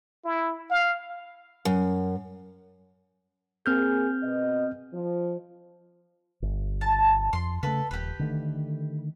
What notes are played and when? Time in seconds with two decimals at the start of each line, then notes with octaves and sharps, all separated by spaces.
0.25 E4
0.71 F5
1.65 F#2
3.66 A#3 C4 G#4 F6 G6
4.22 B2 D#5
4.93 F3
6.42 G1
6.81 A5
7.33 F2 C6
7.63 C#3 A3 A4 B4
7.91 D#1 G4 B4
8.19 D3 D#3 A3